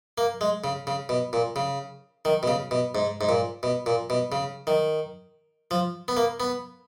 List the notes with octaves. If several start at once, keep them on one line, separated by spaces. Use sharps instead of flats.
A#3
G#3
C#3
C#3
B2
A#2
C#3
D#3
B2
C#3
B2
G#2
G#2
A#2
B2
A#2
B2
C#3
D#3
F3
B3
A#3
B3